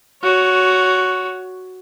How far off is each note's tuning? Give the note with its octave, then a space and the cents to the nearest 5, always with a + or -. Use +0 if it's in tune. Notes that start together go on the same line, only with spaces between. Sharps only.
F#4 +0 C#5 +20